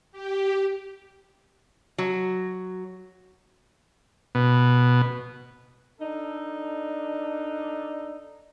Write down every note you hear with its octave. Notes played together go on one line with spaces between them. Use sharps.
G4
F#3
B2
D4 D#4 A4